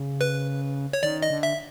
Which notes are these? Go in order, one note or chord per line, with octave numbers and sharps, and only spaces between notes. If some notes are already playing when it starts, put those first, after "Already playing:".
Already playing: C#3
B4
C#5
D#3 D5
D#5
D3
E5